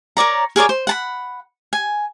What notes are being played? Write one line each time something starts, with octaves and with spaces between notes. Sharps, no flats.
A#4 C#5 D5 A#5
G#4 A#4 C#5 D5
C5
F#5 A5 B5
G#5